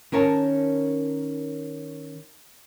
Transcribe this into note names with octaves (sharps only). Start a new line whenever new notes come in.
D#3 C#4 A#4 C#5 A5